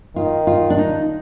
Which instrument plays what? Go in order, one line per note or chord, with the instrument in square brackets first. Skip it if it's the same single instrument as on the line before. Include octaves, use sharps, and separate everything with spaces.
[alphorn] D#3 [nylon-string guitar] F4
[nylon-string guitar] F4
D4
D#4